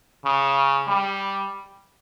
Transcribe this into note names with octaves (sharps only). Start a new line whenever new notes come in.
C#3
G3